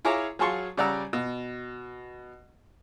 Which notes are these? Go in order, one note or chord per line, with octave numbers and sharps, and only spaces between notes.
E4 F4 G#4 C#5 A#5 D6
F#3 F4 G#4 A5 C6 C#6
C#3 G3 D5 F#5 A#5 E6
B2